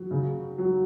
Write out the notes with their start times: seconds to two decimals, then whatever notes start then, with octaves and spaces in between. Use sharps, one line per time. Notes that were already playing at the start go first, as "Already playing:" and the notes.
Already playing: F#3
0.11 C#3
0.58 F#3